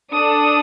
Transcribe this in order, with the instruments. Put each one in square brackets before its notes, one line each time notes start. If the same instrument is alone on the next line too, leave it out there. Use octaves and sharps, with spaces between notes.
[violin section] D4 A4 D#6